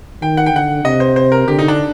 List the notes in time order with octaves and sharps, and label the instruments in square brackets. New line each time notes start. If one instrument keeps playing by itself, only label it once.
[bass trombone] D#3 [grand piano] G5
[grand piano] F#5
G5
[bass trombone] D3 [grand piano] F#5
[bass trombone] C3 [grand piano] D#5
[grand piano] C5
C5
A#4
[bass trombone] D3 [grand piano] G4
[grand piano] D#4
D4